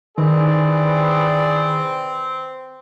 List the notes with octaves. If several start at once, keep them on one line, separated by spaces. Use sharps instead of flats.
D#3 E3 C4 G#4 D5